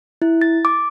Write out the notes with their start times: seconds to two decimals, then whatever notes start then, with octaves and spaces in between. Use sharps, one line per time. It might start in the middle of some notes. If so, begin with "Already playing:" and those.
0.22 E4
0.41 A6
0.65 D6